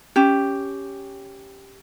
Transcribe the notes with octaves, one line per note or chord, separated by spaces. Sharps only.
C#4 G4